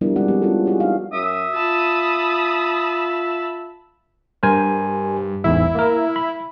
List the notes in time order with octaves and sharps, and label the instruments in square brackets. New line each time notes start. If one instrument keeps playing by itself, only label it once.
[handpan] F3 G3 B3 D4 E4 A#4
G#3 C4 F#4 G#4 D5 F#5
F3 G#3 B3 E4 G4
C#4 E4 F4 A4
C#4 E4 F#4 G#4 C#5
D#4 F5
[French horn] F#2 [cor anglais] E5 [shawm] D#6
[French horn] F4 [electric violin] A5 B5
[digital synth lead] G2 [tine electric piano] A#4 C5 G#5
[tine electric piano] A1 E2 G#2 [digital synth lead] E4
[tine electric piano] A#3 A#4
B5